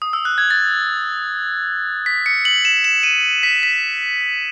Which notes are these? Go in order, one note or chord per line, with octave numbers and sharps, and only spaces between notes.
D#6
E6
F#6
G#6
A6
B6
C#7
F#7
E7
E7
D#7
B6
B6